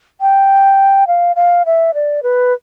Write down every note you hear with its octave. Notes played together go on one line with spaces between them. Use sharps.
G5
F5
F5
E5
D5
B4